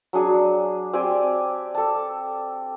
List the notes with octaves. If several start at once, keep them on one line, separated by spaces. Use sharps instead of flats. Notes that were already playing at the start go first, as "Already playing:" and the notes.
F#3 D4 G#4
C4 G4 D5 G#5
A4 A5